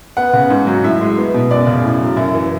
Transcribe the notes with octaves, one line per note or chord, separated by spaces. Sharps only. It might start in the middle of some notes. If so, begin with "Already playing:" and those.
B3 F#5
C#3
G#2
F#3
A2 E5
G#3
B3
B2
F#2 D5
C#3
A2
F#3
F#2 E4
E3